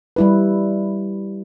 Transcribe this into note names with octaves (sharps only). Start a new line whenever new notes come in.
G3 E4 B4